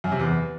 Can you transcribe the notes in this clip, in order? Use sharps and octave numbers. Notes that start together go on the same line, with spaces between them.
F#2
C3
E2